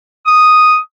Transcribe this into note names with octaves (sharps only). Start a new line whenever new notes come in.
D#6